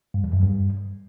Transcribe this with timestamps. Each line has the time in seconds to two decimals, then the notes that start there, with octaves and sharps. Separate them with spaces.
0.14 G2
0.24 E2
0.33 F#2
0.43 G2